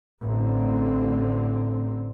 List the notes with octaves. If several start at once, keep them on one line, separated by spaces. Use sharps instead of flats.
A1 D3 C4